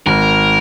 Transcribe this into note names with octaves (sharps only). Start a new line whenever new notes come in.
G#1 A#4